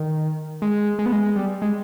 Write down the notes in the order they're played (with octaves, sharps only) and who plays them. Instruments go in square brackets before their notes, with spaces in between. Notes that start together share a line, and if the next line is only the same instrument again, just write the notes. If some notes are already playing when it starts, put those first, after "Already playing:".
Already playing: [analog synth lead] D#3
G#3
G#3
B3
G#3
G3
G#3